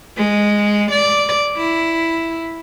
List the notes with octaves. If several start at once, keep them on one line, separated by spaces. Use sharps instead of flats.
G#3
D5
E4